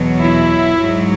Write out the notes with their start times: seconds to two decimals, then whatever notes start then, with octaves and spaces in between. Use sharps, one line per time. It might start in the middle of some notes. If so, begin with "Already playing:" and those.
Already playing: E2 B2 F#3
0.21 E4
0.79 G#2 F#3